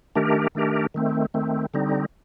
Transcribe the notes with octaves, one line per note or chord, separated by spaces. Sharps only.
D#3 A3 D4 G4 A#4
D#3 A3 D4 G4 A#4
D#3 A3 C4
D#3 A3 C4
D3 G3 C4 D#4